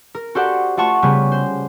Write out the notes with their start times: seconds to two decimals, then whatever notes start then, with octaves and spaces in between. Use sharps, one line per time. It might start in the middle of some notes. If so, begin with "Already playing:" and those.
0.15 A#4
0.35 F#4 G4 A4 C5 D5 F#5
0.77 A3 F4 F#5 A5 C#6
1.02 C#3 G3 B3
1.32 C5